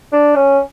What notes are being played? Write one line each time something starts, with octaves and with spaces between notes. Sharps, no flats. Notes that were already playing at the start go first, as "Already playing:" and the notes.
D4
C#4